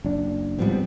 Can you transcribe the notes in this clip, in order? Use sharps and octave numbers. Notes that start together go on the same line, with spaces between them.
F#1 D4
A1 G#2 F3 G3 B3 C4